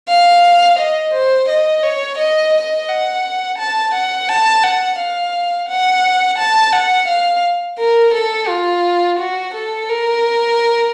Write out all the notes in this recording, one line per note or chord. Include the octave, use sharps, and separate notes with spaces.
F5
D#5
C5
D#5
C#5
D#5
D#5
F#5
A5
F#5
A5
F#5
F5
F#5
A5
F#5
F5
A#4
A4
F4
F#4
A4
A#4